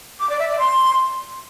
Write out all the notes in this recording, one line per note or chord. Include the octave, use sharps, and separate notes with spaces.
D6
D5
E5
D5
C6